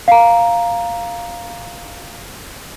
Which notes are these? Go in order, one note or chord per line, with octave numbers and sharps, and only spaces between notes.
F5 A#5